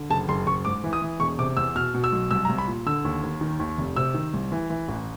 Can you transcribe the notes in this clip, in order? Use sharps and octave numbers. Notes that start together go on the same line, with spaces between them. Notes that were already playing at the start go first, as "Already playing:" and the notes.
Already playing: D3
F#1 A5
F#1 C6
F#1 C#6
G#2 D6
E3
D#6
E3
E1 C#6
C3 D6
E2 E6
B2 F6
B2
E6
B1
C2 E6
A#5
C2
B5
A#2
D3 E6
D#2
D#2
D#3
D#2
F1
C3 E6
D#3
C2
E3
E3
A1